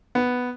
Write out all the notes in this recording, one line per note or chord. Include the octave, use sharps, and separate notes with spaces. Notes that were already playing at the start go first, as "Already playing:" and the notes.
B3